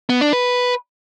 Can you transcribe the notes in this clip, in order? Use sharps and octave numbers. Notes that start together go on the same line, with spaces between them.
B3
D4
B4